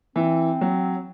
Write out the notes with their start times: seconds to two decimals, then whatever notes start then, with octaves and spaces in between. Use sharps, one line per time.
0.16 E3 C4
0.61 F#3